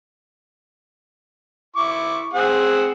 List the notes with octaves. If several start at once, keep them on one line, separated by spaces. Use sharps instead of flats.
E4 C#6 D6
C4 G#4 F#5